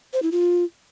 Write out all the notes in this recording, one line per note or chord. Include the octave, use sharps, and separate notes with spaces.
C5
E4
F4